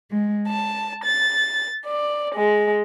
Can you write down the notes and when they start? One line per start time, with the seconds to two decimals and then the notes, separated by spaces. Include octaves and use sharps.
0.11 G#3
0.48 A5
1.03 A6
1.86 D5
2.35 G#3